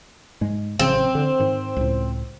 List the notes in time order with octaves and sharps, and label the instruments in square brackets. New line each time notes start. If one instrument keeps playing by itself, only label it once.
[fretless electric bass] G#2 G#3
[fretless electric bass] A1 C#3 F#3 [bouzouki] C4
[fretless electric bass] D3
G#2 D#3
C#2 A2